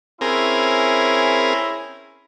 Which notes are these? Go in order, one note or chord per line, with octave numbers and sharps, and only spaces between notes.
C4 C#4 E4 G#4 A#4